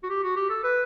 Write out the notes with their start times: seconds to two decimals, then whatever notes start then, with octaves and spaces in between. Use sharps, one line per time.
0.03 F#4
0.10 G4
0.23 F#4
0.36 G4
0.50 A4
0.64 B4